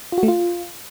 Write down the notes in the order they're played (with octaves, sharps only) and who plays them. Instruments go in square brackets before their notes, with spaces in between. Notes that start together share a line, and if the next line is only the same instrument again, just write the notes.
[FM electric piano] F4
F#4
A3
F4